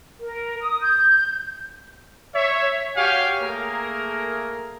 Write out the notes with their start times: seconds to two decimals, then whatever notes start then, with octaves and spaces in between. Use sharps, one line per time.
0.20 A#4
0.61 D#6
0.81 G6
2.35 C#5 E5
2.96 F#4 G4 C#5 F5 G5 G#5
3.42 A3 A#3 G#4 A#4